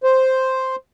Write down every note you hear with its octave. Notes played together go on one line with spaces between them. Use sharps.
C5